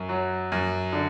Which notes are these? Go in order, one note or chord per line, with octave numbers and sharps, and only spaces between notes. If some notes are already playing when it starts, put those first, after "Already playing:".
Already playing: F#2
F#3
F#2
D3